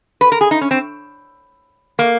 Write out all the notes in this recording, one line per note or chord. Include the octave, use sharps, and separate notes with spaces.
B4
A#4
G#4
D#4
C#4
C4
A#3